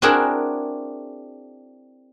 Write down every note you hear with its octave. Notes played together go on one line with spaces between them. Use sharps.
C4 D4 E4 F#4 G#4 A#4